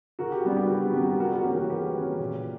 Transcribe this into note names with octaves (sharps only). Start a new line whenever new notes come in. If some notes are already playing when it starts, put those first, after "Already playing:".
C#3 F#4 A#4
G4
G3 B3 D4 F#4
G4
C#3 F#4
G3 B3 D4 G4
F#4
G4
C#3 F#4 A#4
F#4 A#4
E3 A#3 C#4 G4
F#4 A#4
C#3 G4 B4
E3 A#3 C#4
A#2